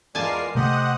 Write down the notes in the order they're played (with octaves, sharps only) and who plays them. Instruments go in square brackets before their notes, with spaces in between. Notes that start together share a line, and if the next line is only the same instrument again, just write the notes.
[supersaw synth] E2 A#4 C7 [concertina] G#3 F4 D5 [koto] G#5 A5
[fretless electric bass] C3 A3 [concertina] G4 C5 D#5 [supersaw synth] F#5 D#6